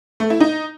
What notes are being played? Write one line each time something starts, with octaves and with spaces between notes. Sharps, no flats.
A3
E4
D#4